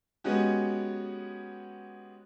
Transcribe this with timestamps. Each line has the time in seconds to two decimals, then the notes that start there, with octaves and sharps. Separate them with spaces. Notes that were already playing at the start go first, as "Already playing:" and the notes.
0.24 G#3 B3 C#4 F#4 G4